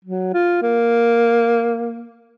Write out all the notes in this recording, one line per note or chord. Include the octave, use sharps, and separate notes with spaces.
F#3
F4
A#3